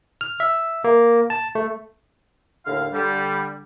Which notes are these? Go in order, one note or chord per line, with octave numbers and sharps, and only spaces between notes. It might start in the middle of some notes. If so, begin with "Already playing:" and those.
F6
E5
A#3
A5
A3
D#2 A2 D3 F5
D3 G3